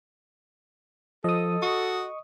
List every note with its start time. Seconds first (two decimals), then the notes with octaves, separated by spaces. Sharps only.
1.24 F3 A4 D#5 D#6
1.62 F#4 C#6